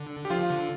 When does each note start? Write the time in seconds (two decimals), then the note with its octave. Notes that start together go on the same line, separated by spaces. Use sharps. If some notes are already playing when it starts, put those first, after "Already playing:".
Already playing: D3
0.25 G4
0.30 F3 F4
0.49 D3